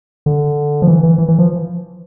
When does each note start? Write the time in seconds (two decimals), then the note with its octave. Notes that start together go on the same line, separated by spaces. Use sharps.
0.26 D3
0.82 F3
0.88 E3
1.03 E3
1.18 E3
1.28 E3
1.39 F3